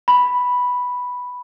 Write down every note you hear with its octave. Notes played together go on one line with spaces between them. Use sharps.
B5